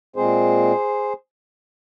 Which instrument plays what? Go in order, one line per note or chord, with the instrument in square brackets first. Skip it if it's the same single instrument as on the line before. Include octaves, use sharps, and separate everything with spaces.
[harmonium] A#2 G#3 C4 G#4 C5